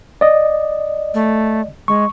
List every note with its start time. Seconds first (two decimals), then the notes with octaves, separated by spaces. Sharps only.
0.21 D5 D#5
1.14 A3
1.88 G#3 C#6